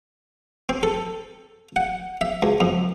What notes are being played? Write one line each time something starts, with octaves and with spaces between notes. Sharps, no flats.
C4
A4
F#5
E5
C#2
F2